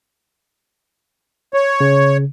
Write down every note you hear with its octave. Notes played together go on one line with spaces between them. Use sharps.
C#5
C#3